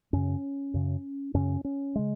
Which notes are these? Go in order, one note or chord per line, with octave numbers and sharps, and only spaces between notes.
F#2 C#3 C#4
F#2 C#3
F#2 C#3 C#4
C#4
C#3 G#3